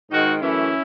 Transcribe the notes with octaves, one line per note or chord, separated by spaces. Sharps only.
G#2 D#3 G#3 D#4 F#4
F#2 E3 A3 C#4 E4